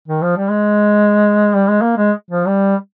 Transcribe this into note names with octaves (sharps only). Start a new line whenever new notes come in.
D#3
F3
G3
G#3
G3
G#3
A#3
G#3
F3
G3